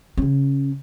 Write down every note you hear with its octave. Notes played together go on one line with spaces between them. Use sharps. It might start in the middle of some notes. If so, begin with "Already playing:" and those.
C#3 C#4